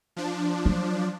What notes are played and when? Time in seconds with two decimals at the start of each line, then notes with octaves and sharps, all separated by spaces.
0.16 F3 D4
0.66 F#3